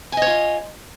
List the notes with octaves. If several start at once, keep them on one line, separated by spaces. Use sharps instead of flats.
F4 C#5 D#5 G#5